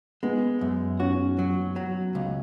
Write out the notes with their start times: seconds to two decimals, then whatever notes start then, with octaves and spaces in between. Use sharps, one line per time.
0.23 G#3 B3
0.61 F#2
1.00 C#4 F#4
1.39 F#3
1.76 F#3
2.15 C#2